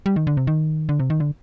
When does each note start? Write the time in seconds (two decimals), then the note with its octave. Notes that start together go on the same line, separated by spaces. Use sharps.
0.06 G3
0.16 D#3
0.27 D3
0.37 C3
0.47 D#3
0.89 D3
1.00 C3
1.10 D#3
1.20 D3